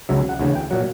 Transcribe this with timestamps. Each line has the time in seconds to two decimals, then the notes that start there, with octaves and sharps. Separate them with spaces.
0.09 C#2 C#3 F#3 E5
0.29 F#5
0.39 D2 C#3 E3 F#5
0.55 G5
0.71 A#2 F#3 F#5